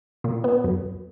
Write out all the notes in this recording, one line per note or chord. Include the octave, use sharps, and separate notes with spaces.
A#2
B3
F#2